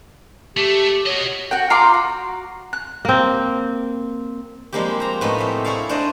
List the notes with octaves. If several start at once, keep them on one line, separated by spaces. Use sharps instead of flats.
A3 G4 A4
F#4 C#5 D#5
F#4 F#5 G5
F4 A#5 C6 D6
F#4
F#6
A#3 C4
F3 G3 G#3 A#3 C4 G4
C5 A#5
A2 B3 C#4 D#4
C3 C4
E4 G#4 C#5 D5 F5
D4 E4 C5 D5 D#5